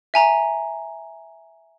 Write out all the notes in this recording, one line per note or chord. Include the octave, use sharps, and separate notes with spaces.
E5 G#5 A#5